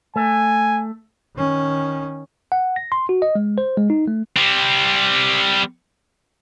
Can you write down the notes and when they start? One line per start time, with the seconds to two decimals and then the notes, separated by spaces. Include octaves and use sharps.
0.16 A3 G#5
1.35 D#3 C#4
2.52 F#5
2.76 A#6
2.92 C6
3.09 F#4
3.22 D#5
3.35 G#3
3.58 C5
3.77 G#3
3.90 D#4
4.08 A3
4.36 G3 C4